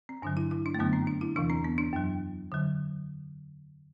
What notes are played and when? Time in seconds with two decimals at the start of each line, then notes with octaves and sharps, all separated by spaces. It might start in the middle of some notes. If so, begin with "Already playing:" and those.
0.09 C4
0.22 G2 D3 F#3 D4
0.37 E4
0.51 E4
0.66 D4
0.74 A3
0.79 F#2 D3 F#3 B3
0.93 C4
1.07 D4
1.21 E4
1.36 E2 C3 E3 D4
1.50 C4
1.64 B3
1.78 D4
1.92 F#2 F#3
2.52 D3 F#3